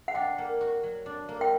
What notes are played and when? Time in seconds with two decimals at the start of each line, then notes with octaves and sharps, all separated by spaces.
0.08 F#5
0.15 D4 G5
0.38 A#3
0.61 F#4
0.83 F#3
1.06 D4
1.29 A#3
1.41 G5